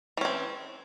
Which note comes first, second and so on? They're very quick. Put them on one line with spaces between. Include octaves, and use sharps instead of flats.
E3 C#4 C4